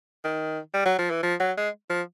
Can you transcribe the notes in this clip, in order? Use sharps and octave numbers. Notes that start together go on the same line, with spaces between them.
D#3
G3
F#3
F3
E3
F3
F#3
G#3
F3